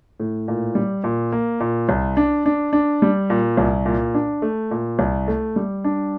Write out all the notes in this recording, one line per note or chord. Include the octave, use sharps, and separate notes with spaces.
A2
A#2
G3
A#2
A#3
A#2
C2
D4
D4
D4
G3
A#2
C2
A#2
D4
A3
A#2
C2
A3
G3
D4